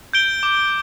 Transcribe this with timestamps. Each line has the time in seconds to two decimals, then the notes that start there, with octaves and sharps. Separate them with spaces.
0.13 G6 D7 G7
0.43 D6